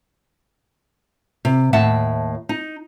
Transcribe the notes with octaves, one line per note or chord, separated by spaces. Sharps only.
C3
D#2 A2 E5 F#5 A5
D#4